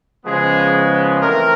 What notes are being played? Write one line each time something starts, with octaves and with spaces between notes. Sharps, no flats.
C#3 F3 G#3 B3 G#4
E3 A3 C4 A#4